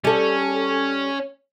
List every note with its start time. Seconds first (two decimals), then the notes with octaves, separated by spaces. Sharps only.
0.05 G3 C#4 A4